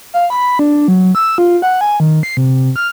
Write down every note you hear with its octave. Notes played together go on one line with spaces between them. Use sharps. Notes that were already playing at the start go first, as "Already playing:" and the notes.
F5
B5
D4
F#3
E6
F4
F#5
G#5
D#3
C7
C3
F6